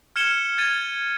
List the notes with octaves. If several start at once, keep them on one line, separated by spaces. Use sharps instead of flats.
F6 G#6 C#7 E7 G7
G#6 A6 D#7